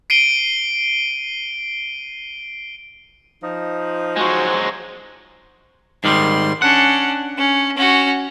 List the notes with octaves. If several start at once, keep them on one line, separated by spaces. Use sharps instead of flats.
C7 D7 D#7 G7
F3 D#4
F#3 G#3 F#4 C5
G#2 D#3 G3 C6
C#4 D4 F#5
C#4
C#4 F#4